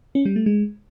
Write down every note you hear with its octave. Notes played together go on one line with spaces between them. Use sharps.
C#4
G3
A3
G#3